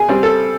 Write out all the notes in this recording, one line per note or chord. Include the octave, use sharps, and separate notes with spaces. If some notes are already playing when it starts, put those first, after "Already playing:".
Already playing: B2 G#4
G3 C4
A4